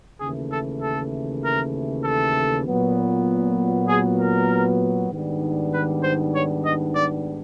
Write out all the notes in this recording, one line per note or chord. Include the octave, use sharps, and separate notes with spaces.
D#2 C#3 E3 A3 G#4
A4
A4
A#4
A4
A#2 F#3 B3
G#4
A#4
G#2 D#3 G3 B3 D4
B4
C5
C#5
D#5
D5